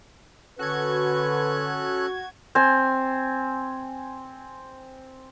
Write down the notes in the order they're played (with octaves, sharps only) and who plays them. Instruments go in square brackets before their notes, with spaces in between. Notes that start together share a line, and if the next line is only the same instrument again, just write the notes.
[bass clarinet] D3 [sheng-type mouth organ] C#4 A4 F#6 [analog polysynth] F#4 G#6 [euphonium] B4
[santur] C4 G#5